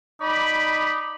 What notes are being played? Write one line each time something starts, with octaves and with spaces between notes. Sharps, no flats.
D#4 D5 B5